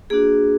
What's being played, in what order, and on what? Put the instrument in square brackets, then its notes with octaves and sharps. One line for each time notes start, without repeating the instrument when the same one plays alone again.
[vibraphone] A#3 D4 F#4 G#4